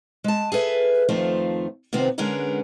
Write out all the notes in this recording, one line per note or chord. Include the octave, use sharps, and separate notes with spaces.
G#3 A5
G#4 A4 B4 E5
F2 D#3 F3 A3 F4
C3 D#3 F3 B3 C4
D3 G#3 B3 C#4 D4 A#4